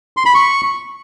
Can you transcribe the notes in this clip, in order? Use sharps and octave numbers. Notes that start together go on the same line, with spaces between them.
C6
B5
C#6